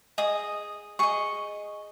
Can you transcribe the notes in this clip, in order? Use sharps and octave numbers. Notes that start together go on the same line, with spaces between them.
G#4 D#5 D#6
G#4 D#5 C#6